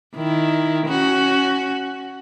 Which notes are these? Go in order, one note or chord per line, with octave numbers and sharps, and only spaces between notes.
D#3 E4
C#4 F#4